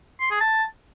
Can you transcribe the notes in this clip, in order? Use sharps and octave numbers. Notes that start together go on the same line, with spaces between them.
C6
G#4
A5